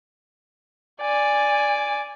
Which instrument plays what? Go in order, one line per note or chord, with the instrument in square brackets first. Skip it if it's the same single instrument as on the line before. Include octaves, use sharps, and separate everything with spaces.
[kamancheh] D5 G#5